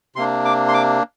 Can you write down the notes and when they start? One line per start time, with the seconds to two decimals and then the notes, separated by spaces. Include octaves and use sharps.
0.16 C3 A#3 D4 C6
0.45 D6
0.68 C6
0.74 D6